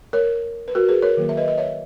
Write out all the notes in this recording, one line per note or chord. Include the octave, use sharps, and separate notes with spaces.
A#4 C#5
B4
F#4 A#4
G#4 B4
A#4 C#5
D#3 F#3 A#3
E5
B4 D#5
B4 D#5
C#5 E5